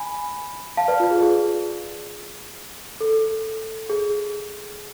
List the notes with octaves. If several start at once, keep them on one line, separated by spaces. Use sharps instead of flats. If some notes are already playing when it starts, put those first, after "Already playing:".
Already playing: G#5 B5
F5 A5
B4 D5
F4
G#4
G#4
A4
G#4